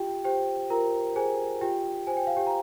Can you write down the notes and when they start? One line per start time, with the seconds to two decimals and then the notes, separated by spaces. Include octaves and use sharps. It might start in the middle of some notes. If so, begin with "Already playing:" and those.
Already playing: F4 G4 G5
0.24 G4 C5 G5
0.70 F4 A#4 A#5
1.16 G#4 C5 G#5
1.61 F4 G4 G5
2.07 C5 G#5
2.17 G5
2.27 F5
2.37 G4 G5
2.47 A#5